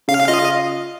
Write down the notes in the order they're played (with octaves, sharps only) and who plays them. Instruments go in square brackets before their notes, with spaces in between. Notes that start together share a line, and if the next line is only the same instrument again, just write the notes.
[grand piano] C#3 [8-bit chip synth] F5
[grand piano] F4 [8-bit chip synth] D#5